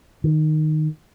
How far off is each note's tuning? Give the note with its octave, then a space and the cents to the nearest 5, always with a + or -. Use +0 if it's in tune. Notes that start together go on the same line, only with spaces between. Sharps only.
D#3 -10